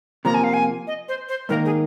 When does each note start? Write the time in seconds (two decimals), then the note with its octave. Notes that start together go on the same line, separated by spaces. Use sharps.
0.25 C3 F3 A#3 A#5
0.34 G#5
0.44 F5
0.54 G#5
0.87 D#5
1.08 C5
1.29 C5
1.49 G#2 D#3 A#3 D#4 A#4
1.65 G#4